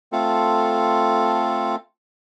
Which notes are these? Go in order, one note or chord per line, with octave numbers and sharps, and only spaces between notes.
A3 C4 F4 A4